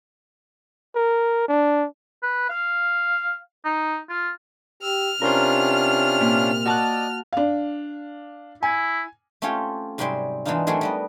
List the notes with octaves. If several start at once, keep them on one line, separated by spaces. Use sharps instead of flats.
A#4
D4
B4
F5
D#4
F4
G4 E6 F6
C3 C#4 D4 F4 A#4 C5
A#2
F#4 D5 D#5 A5 F#6
D4 F5
E4 G#5
A3 C4 C#4 F4 G4 C#5
G#2 C3 F#3 G3 C4 G#4
E3 G#3 B3 D4 D#4 F4
F#3 A3 C4 E4 G#4 A#4
G3 B3 D#5